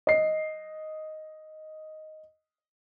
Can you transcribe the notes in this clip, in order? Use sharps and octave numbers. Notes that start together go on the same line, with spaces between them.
D#5 C7